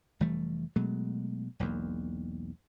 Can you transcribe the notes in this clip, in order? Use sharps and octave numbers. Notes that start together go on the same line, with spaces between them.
F1 E3 G3 A3
B2 F#3 G#3 A3
E1 B1 E2 A#3